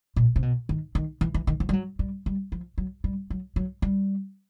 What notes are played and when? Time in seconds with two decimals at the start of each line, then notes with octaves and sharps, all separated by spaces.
0.16 A#2
0.36 C3
0.42 B2
0.69 D#3
0.95 D#3
1.21 E3
1.34 E3
1.47 D#3
1.60 F3
1.69 G3
1.73 F#3
1.99 G3
2.26 G3
2.52 F3
2.78 F#3
3.04 G3
3.30 F#3
3.56 F#3
3.82 G3